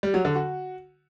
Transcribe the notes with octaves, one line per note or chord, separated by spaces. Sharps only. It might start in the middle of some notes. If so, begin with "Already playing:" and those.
G3
F#3
D3
F#4